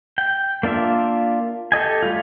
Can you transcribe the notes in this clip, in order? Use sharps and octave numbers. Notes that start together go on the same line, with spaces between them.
G5
A#3 D4 F4 E5
G4 A4 D#5 G#5
G3 A3 F4